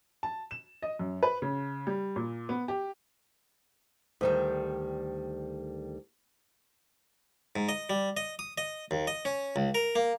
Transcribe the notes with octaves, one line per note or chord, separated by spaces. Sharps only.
A5
E7
D#5
F#2
B4
C#3
G3
A#2
B3
G4
D2 D#3 G3
G#2
D#5
G3
D#5
D#6
D#5
D#2
D#5
C#4
C#2
A#4
A#3